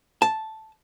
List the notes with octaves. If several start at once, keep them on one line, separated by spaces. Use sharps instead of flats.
A5